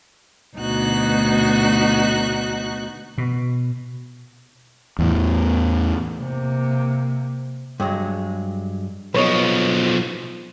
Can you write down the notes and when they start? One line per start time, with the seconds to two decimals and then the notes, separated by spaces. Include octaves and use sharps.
0.56 D2 B2 D#4 F#4 F#6
3.18 B2
4.99 E2 A2
6.20 C3 A#3
7.80 G2 F#3 G#3
9.14 B1 F3 B4 C#5 D#5